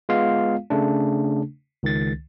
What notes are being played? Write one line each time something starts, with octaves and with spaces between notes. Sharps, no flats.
G#3 B3 F4 F5
C#3 A3 D4
C#2 D#3 A6